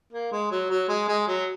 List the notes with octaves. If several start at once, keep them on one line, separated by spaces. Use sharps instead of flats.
A#3
G#3
F#3
F#3
G#3
G#3
F#3